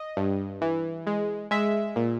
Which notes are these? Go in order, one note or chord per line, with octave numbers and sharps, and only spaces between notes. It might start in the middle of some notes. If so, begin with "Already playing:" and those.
Already playing: D#5
G2
E3
G#3
G#3 E5
A#2